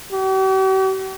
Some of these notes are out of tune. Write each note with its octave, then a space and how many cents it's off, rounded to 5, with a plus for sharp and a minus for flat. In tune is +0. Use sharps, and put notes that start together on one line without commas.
G4 -45